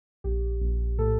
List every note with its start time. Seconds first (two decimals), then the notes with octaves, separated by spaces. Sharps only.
0.24 A#1 G4
0.61 A#1
0.98 A2 A4